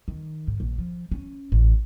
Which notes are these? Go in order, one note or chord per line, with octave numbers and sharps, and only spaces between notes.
D#3
G#2
A#1
F3
C#4
A1